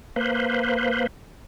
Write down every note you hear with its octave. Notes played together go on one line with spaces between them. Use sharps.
A#3 B4 C5